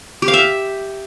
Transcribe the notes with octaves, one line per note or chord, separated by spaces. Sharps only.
G4
F5
E5